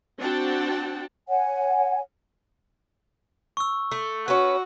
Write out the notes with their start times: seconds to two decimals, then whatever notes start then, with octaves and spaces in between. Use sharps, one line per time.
0.19 C4 D4 F#4 F#5 G5 A5
1.28 C#5 F#5 G#5
3.57 C#6 E6
3.91 A3
4.28 C#4 F#4 B4